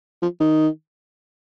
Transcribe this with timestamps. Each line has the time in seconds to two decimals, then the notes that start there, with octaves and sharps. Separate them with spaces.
0.22 F3
0.40 D#3